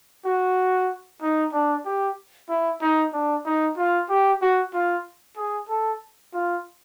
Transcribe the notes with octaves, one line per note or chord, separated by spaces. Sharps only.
F#4
D#4
D4
G4
E4
D#4
D4
D#4
F4
G4
F#4
F4
G#4
A4
F4